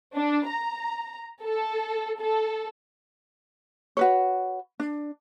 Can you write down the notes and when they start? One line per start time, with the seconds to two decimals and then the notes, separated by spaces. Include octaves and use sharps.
0.15 D4
0.48 A#5
1.43 A4
2.20 A4
3.97 F#4 B4 C#5
4.80 D4